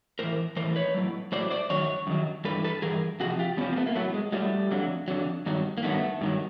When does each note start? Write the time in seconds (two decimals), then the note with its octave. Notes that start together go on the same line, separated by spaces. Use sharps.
0.19 A2 E3 A#4 C5
0.56 E3 A#4 C5
0.60 A2
0.76 B4 C#5
0.94 A2 F#3
1.32 A2 F#3 C5 D5
1.50 C5 D5
1.70 F#2 D#3 F#3 C#5
2.07 F#2 D#3 F#3
2.45 G2 E3 A4 B4
2.64 A4 B4
2.82 G2 E3 G#4 A#4
3.20 F2 C3 F3 F#4 G#4
3.39 F4 G4
3.57 F2 C3 F3 B3 C#4
3.73 A#3
3.76 A3 B3
3.87 A#3
3.95 A2 F#3 A3 B3
4.14 G#3
4.32 A2 F#3 G3 A3
4.71 F2 D3 F#3
5.08 F2 D3 F#3
5.46 G2 D#3 F#3
5.78 A#3
5.83 G2 D#3 F#3 A3 B3
6.21 G2 D#3 F#3